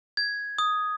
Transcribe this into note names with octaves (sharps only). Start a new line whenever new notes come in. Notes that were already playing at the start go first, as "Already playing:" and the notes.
G#6
D#6